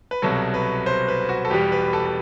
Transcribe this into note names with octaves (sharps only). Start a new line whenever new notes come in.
B4
C2 B2 F#3 A4
B4
C5
B4
F#4
A4
E2 B2 G3 G4
B4
A4
A4